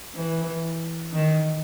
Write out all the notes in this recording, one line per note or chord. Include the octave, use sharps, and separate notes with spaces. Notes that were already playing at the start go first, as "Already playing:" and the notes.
E3
D#3